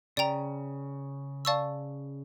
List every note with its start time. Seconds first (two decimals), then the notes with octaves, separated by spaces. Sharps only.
0.17 C#3 D5 G5 A#5
1.45 D5 F5 A5 C#6 E6